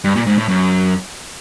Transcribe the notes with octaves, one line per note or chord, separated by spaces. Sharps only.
G2
A#2
G#2
A2
F#2